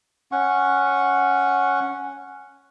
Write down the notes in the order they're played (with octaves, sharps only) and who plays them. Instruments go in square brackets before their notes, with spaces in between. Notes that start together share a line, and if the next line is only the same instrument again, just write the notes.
[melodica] C#4 F#5 C#6